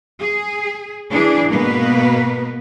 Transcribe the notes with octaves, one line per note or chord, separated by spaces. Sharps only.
G#4
E3 D4 G#4
G#2 B2 A#3 B3 A#4 B4